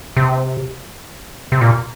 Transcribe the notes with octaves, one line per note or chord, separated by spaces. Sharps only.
C3
C3
A#2